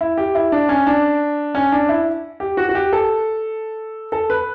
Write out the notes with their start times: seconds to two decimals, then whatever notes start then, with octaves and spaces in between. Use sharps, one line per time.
0.01 E4
0.17 G4
0.35 E4
0.52 D4
0.69 C#4
0.87 D4
1.55 C#4
1.72 D4
1.89 E4
2.40 G4
2.57 F#4
2.69 F#4
2.75 G4
2.93 A4
4.12 A4
4.30 B4